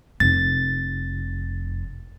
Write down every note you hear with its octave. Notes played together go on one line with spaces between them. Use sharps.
F1 A6